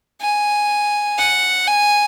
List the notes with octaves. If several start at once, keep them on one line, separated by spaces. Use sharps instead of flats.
G#5
F#5
G#5